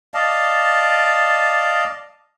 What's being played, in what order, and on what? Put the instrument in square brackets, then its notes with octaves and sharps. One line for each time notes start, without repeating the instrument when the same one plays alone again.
[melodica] D5 D#5 F5 A5